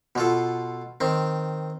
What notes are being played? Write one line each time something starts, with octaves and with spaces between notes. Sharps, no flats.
B2 F4 A4
D#3 C4